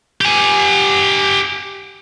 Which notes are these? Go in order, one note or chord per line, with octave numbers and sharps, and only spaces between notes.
G4 G#5